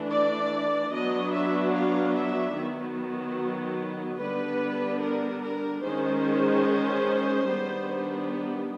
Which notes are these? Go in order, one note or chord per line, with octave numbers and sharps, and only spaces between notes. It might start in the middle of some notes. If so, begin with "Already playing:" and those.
Already playing: E3 A3 D4
D5
F#3 B3 D4 D#5
E5
F5
E5
D#3 F#3 B3
D3 G3 B3 D4 B4
A#4
A#4
D#3 G#3 C#4 C5
D#3 G3 B3 D4